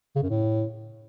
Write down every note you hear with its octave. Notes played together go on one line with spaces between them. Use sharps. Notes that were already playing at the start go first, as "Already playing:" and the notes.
C#3
F#2
A2